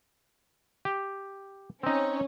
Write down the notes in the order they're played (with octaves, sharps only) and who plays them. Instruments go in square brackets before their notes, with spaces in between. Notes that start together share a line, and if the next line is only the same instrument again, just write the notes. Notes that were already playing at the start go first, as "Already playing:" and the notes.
[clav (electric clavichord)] G4
[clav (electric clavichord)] C4 D#4 [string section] C#4